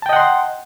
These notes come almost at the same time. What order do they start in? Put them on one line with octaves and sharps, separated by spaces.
A5 G5 D#5 F#5 C6